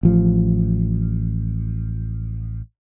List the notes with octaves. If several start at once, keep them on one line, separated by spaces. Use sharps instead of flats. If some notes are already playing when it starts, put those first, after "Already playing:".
A1 F3